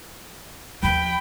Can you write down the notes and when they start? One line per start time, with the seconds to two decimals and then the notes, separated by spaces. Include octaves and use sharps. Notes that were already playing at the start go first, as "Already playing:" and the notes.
0.83 D#2 F3 G5 B5